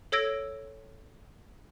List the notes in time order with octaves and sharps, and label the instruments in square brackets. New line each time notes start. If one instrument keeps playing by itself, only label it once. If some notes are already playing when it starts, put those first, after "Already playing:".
[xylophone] A4 C#5 E6 G#6 A#6 D7